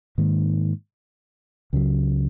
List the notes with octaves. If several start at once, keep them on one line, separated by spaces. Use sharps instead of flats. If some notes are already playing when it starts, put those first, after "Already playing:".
G#2 D#3 A#3
C#2 C#3 F#3